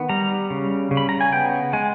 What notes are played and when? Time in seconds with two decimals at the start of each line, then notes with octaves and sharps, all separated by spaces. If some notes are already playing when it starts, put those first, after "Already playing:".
Already playing: D#3 B3
0.09 G3 A#5
0.50 C#3
0.91 C#3
0.97 B5
1.09 A#5
1.21 G#5
1.32 B3 G5
1.73 G#3 G#5